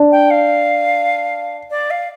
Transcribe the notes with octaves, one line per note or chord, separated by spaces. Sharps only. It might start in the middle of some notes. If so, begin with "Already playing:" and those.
Already playing: D4
G5
F5
D5
F5